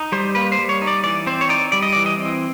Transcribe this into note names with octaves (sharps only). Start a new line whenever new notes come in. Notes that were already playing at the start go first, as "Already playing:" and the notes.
Already playing: D#4
G3 C5
A#3 B4
C5
G3
C#5
D#4
D5
E3 D5
C4 C5
C#5
D#4 D5
G3 D5
D#5
E3 D5
D#5
C4